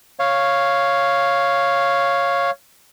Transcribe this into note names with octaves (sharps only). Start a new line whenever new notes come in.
C#5 F5